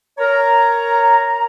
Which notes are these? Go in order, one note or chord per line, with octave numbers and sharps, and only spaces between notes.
A#4 C#5 A#5